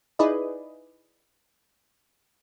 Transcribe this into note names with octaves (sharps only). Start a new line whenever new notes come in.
D#4 E4 G#4 B4 D5 D#5